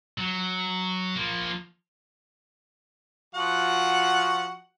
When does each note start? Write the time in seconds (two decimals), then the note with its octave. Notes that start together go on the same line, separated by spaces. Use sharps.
0.18 F#3
1.16 F3 A#3
3.35 F3 F#4 F#5